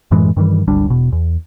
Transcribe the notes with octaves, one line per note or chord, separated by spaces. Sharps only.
F#2 A2 E3 G#3
G2 D#3 E3 G3
G#1 D2 G3 D4
E1 B2
E2